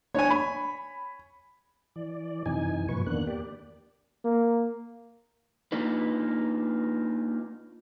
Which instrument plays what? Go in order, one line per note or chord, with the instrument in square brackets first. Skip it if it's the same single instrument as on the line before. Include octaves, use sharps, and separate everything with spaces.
[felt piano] D4 [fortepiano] C#5 G#5
[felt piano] B5
[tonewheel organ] E3 D5
F#2 C3 E3 D#4 G#5
G2 A#2 F3 B4 C#6
E2 D#3 A#3 B3 D4 F#6
A#3 G4 D5
[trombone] A#3
[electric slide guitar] A#3 D4 D#4 F4 B4